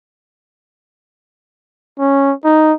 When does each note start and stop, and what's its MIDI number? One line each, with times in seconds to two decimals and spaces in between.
1.99 2.32 61
2.45 2.73 63